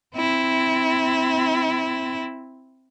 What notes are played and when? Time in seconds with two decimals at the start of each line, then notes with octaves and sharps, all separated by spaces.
0.16 C4 E4